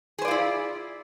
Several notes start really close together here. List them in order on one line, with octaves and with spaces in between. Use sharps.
G#4 C5 D5 F4 E4